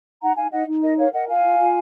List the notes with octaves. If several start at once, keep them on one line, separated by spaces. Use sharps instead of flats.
D#4 F#5 A#5
D#4 F5 G#5
D#4 D#5 F#5
D#4
A#4 D#5
A#4 C#5 F5
A#4 D#5 F#5
F4 F5 G#5
F4
F4